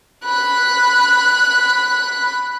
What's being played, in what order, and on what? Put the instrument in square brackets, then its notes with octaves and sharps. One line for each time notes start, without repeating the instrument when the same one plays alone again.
[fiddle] B5 F#6